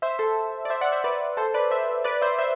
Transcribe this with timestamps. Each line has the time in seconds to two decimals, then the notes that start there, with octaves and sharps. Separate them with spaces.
0.02 C5 E5
0.19 A4 C5
0.65 D5
0.70 C5 E5
0.81 D5 F#5
0.92 C5 E5
1.04 B4 D5
1.37 A4 C5
1.54 B4 D5
1.71 C5 E5
2.04 B4 D5
2.21 C5 E5
2.38 C5 E5